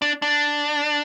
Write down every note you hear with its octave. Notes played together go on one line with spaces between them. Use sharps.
D4
D4